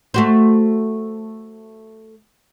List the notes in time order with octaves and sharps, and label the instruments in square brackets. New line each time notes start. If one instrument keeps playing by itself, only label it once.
[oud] A3 F#4 C5